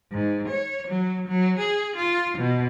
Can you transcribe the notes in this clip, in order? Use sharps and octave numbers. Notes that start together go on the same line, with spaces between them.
G#2
C#5
F#3
F#3
G#4
F4
B2